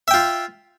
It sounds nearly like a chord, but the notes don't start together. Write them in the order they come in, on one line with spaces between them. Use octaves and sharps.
E5 G5 F4